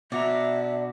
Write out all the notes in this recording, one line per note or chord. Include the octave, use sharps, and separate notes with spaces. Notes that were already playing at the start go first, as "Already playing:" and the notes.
B2 D4 F#4 E5 A#5